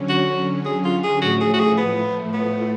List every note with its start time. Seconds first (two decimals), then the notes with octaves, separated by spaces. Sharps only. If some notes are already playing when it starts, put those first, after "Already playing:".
Already playing: D3 F#3 C#4
0.09 F#4
0.65 G#4
0.85 F4
1.04 G#4
1.21 A2 F3 A3 F#4
1.40 G#4
1.53 F#4
1.59 G#4
1.78 B3
2.34 B3